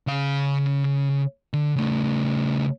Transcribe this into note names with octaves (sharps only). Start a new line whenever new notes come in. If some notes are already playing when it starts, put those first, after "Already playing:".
C#3 F5
D3
C#3 A3